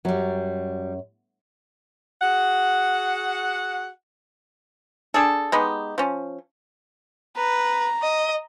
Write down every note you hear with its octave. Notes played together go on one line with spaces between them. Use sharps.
F#2 F#3 G3
F#4 G#4 F#5
D4 G#4 A4
G#3 B3 D#4 G4
F3 C#4
B4 A#5
D#5